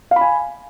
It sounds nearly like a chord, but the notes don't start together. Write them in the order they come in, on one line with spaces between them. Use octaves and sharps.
F5 B5 G#5